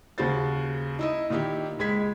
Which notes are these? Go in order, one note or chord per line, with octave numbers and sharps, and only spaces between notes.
D#2 C#3 F#4 C5 A6
D#4 E4 D#5
A#2 D#3 D#4 E4 G4
C#2 G#3 G#6 B6